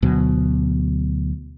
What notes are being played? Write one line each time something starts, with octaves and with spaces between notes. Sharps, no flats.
D2 B2 F#3